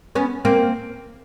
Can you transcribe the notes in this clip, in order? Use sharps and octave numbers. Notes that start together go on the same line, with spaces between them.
B3 C#4
A#3 C4